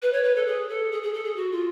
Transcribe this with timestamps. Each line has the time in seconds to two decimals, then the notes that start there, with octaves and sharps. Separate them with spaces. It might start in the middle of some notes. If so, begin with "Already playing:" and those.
0.02 B4
0.13 C#5
0.23 B4
0.35 A4
0.47 G#4
0.69 A4
0.91 G#4
1.03 G#4
1.13 A4
1.25 G#4
1.36 F#4
1.51 F4